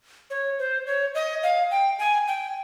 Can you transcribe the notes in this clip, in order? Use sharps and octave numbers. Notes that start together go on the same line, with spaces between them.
C#5
C5
C#5
D#5
F5
G5
G#5
G5